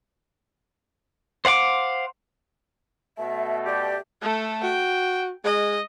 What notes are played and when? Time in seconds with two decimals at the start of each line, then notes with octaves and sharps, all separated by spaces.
1.45 C5 F5 F#5 D6
3.18 B2 A3 E5
3.66 G4 D5
4.22 A3 A4
4.64 F#4 G5
5.45 G#3 D#5